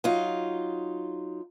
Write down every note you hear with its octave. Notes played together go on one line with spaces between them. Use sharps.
F#3 D#4 F4